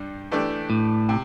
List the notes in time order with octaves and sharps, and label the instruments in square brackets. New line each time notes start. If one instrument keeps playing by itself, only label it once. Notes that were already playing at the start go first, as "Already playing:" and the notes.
Already playing: [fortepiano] G2 G3
E3 A3 D4 G4
[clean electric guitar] A2
[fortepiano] C3